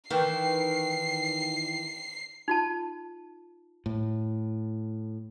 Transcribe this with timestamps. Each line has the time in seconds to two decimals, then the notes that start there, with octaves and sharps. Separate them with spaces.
0.10 D#3 E3 C7
2.48 D#4 F4 A5
3.86 A2